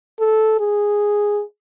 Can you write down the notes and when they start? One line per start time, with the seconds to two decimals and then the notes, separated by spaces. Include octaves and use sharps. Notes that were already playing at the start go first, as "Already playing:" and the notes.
0.20 A4
0.59 G#4